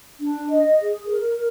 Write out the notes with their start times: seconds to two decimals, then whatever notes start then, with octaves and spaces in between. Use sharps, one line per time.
0.20 D4
0.49 D#5
0.78 G#4
1.06 A#4